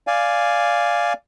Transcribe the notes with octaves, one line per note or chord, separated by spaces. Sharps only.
D5 F5 G#5